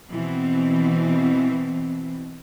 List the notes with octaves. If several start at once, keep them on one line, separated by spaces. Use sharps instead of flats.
B2 E3 C4